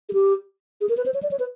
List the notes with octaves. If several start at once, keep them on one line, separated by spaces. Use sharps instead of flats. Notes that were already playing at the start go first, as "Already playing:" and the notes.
G#4
G4
G#4
A#4
B4
C5
C#5
D5
C#5
B4